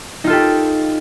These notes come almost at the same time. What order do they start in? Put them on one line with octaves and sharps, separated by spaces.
D#4 F4 A4 G4